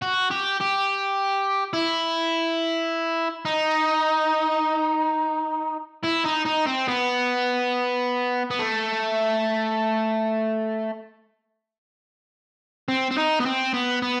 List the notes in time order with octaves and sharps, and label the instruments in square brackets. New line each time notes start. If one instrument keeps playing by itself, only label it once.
[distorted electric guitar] F#4
G4
G4
E4
D#4
E4
D#4
D#4
C4
B3
B3
A3
C4
C4
D#4
B3
C4
B3
B3